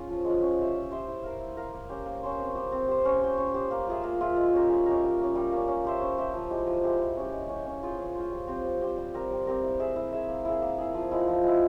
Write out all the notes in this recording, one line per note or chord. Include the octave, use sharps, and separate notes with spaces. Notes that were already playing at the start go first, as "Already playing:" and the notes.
Already playing: C#4 F4 G#4
F3
G#3 C#4 F4
C#4
G4 C5 E5
C#4
G4 C5 E5
E4
A#4 F5
E4
A#4 F5
A#3
C#4 G4 C5
A#3
C#4 G4 C5
C4
G4 C5
C4
G4 C5
C#4
G4 C5
C#4
G4 C5
A#3
F4 G#4 E5
A#3
F4 G#4 E5
G#3
C#4 G4 A#4
G#3
C#4 G4 A#4
G3
A#3 C#4
G3
A#3 C#4
C#4
G4 C5 E5
C#4
G4 C5 E5
F3
G#3 E4 G4
F3
G#3 E4 G4
G#3
C#4 G4
G#3
C#4 G4
C#4
F4 G#4 C5
C#4
F4 G#4 C5
G3
C4 G4 C5
G3
C4 G4 C5
G3
C4 G4 A#4
G3
C4 G4 A#4
E4
G#4 E5
E4
G#4 E5
A#3
E4 G#4
A#3
E4 G#4
F3
G#3 E4
F3
G#3 E4